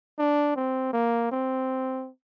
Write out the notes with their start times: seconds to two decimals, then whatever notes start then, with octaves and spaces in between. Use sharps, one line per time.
0.18 D4
0.56 C4
0.93 A#3
1.32 C4